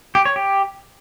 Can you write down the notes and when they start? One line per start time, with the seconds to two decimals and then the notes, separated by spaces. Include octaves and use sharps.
0.15 G4
0.25 C#5
0.36 G4